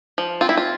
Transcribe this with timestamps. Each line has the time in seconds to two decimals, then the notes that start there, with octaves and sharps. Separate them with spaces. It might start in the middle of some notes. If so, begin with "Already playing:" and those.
0.18 F3
0.41 C4 F4
0.49 E4
0.57 F4